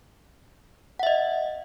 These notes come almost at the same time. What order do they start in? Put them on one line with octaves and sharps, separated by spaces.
F#5 E5 D#5